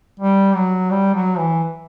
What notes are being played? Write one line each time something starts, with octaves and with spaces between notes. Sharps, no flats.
G3
F#3
G3
F#3
E3